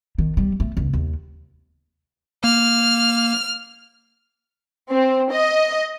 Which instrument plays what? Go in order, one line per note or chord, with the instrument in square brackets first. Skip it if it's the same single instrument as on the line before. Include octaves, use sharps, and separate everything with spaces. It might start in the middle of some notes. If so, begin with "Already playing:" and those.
[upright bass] D#3
G3
A3
C#2
D#2
[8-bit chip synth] A#3 [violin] F6
[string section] C4
D#5